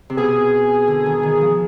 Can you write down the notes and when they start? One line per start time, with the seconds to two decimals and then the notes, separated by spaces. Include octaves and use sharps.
0.10 C3
0.17 B2 G#4
0.88 D3
1.06 D#3
1.23 D#3
1.41 F3